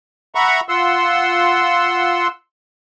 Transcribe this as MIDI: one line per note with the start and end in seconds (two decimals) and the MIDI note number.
0.35 0.60 76
0.35 0.60 78
0.35 0.60 82
0.35 0.60 83
0.35 0.60 85
0.69 2.28 65
0.69 2.28 78
0.69 2.28 84
0.69 2.28 88